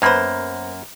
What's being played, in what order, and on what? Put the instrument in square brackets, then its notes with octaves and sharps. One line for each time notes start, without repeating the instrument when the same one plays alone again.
[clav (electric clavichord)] F#2 A#3 [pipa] B3 B4 C5